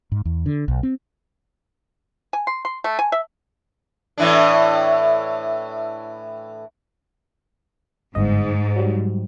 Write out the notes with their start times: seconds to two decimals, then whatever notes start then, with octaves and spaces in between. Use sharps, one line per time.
0.12 G#2
0.25 E2
0.46 D3
0.68 B1
0.83 C4
2.33 G#5
2.47 C6
2.65 C6
2.84 A3
2.99 G#5
3.12 E5
4.18 A2 E3 D4
8.15 G1 G#2 D#5
8.76 F#3 G3